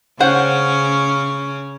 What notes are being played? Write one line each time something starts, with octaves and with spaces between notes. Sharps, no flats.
C#3 C#4 C5 F#5 G5